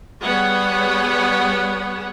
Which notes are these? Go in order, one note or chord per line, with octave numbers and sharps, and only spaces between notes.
G3 B3 G#4 C#5 F#5